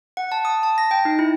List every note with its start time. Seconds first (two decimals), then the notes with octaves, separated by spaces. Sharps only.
0.17 F#5
0.32 A5
0.45 D#6
0.63 A5
0.78 A#6
0.91 G5
1.05 D#4
1.19 E4